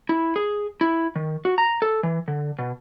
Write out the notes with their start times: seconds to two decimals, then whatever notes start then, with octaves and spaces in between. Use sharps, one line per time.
0.09 E4
0.36 G#4
0.81 E4
1.16 D#3
1.45 F#4
1.58 A#5
1.82 A4
2.03 E3
2.28 D3
2.59 B2